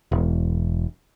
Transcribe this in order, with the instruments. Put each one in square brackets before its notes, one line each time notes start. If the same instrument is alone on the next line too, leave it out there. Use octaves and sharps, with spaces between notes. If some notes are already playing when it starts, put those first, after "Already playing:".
[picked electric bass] E1